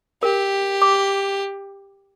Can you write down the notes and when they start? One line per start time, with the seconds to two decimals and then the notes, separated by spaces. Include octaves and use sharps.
0.23 G4 A#4
0.82 D6